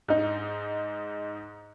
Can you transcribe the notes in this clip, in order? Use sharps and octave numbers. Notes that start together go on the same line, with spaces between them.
G#2 D#4